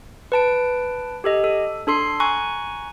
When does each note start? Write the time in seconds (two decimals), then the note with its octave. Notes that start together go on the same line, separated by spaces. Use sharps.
0.32 B4 A5 D7
1.24 G4 A4 D#5
1.44 A4
1.87 D4 A4 C6 C7
2.20 G#5 A#5 C#6 F#6